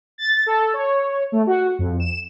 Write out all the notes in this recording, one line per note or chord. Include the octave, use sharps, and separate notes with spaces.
A6
A4
C#5
A3
F#4
F2
E7